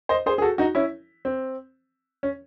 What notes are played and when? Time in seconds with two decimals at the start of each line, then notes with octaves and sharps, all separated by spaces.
0.09 C5 D#5
0.26 G#4 C5
0.38 G#4
0.42 F#4 A4
0.58 D#4 F#4
0.75 C#4 E4
1.25 C4
2.23 C#4